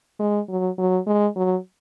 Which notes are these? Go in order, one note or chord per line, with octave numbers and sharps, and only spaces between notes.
G#3
F#3
F#3
G#3
F#3